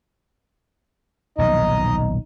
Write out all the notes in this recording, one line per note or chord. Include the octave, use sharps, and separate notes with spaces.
D#1 B1 F3 D#4 D#5